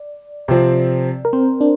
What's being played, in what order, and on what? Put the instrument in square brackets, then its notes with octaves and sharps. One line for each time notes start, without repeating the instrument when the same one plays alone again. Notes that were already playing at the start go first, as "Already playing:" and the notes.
Already playing: [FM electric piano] D5
[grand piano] C3 F3 C4
[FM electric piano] A#4
C4 C5
D4